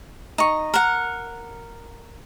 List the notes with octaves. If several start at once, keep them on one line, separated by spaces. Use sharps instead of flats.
D#4 C#6
A#4 F#5